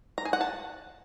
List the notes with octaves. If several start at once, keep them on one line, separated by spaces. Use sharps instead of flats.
A#5
G#4
F#5
A5